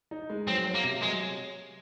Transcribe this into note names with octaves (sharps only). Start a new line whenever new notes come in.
D#4
G#3
F#3 C4
F#3
A#3
C3
F#3 G#3